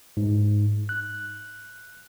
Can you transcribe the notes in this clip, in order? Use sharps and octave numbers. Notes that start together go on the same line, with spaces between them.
G#2
F#6